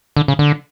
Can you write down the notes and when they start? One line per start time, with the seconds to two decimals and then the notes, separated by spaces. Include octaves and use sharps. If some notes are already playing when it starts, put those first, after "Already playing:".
0.17 D3
0.28 C#3
0.39 D3